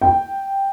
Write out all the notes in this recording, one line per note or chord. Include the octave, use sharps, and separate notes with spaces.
G5